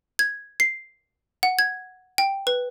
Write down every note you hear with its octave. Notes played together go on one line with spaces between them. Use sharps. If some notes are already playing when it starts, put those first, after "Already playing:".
G#6
C7
F#5
G#6
G5
B4